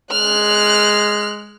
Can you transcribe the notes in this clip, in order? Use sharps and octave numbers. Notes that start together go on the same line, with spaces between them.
G#3 F6 F#6